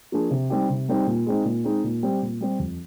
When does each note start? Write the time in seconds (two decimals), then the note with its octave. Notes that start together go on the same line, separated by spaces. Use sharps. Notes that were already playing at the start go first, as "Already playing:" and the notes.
0.12 F3 A#3 D4 G#4
0.31 C3
0.50 G3 C4 D#4 G4
0.69 C3
0.89 G3 C4 D#4 G4
1.07 A#2
1.26 G#3 C4 D#4
1.45 A#2
1.64 G#3 C4 D#4
1.84 A#2
2.03 G3 C4 G4
2.22 A#2
2.41 G3 C4 G4
2.59 F2